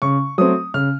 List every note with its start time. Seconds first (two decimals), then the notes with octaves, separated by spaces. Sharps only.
0.02 C#3 C#6
0.38 F#3 A3 C4 D#6
0.74 C#3 F6